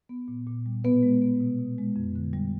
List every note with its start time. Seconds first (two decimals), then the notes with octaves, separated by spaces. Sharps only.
0.09 B3
0.28 A#2
0.47 A#2
0.66 G3
0.84 B2 B3 B4
1.03 G#3
1.21 B3
1.40 B2
1.59 B2
1.78 G#3
1.96 F2
2.16 D3
2.33 G3